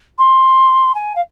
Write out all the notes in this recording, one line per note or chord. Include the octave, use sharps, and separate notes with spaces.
C6
G#5
F5